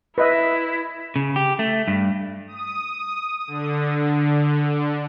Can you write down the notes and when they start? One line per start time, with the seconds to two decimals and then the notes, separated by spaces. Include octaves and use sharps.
0.18 E4 B4 D#5 E5
1.16 C#3
1.36 G4
1.59 A3
1.88 G2
2.47 D#6
3.47 D3